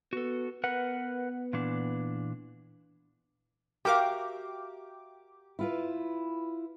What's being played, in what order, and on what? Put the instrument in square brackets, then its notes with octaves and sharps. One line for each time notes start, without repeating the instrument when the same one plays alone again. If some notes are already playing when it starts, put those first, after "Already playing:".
[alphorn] B3 [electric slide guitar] F#4 A4
[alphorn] B3 [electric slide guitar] A#4 B4 F#5
[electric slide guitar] A#2 E3 D4
[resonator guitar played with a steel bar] F#4 A#4 F5 [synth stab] G4 D6 [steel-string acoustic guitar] E5
[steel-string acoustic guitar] E4 F4 B4